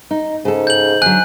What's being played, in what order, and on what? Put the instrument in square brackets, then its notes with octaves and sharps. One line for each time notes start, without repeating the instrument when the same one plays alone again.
[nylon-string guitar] D#4
[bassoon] G#2 [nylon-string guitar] C#3 A4
[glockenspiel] G6 F#7
[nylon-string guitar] D3 F#3 [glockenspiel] G#5 F#6